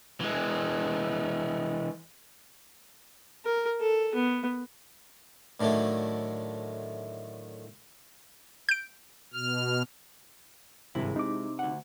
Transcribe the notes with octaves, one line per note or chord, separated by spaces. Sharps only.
E3 G#3
A#4
A4
B3
A2 D3 D#3 F#3 A3
G6 D7
B2 F6
G#1 G2 C3 G#3 E4
C3 D#4 D6
D2 F#5